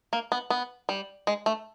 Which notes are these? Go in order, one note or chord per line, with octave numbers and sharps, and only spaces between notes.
A#3
B3
B3
G3
G#3
A3